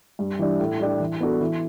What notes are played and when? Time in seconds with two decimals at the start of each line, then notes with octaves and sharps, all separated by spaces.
0.19 G2
0.39 E3 G3 D4
0.60 A2
0.80 G3 D4 G4
1.00 E3
1.20 B3 D4 F#4 A4
1.41 E3